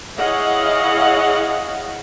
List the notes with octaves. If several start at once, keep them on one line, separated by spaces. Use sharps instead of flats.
E4 G#4 C#5 D#5 F5 F#5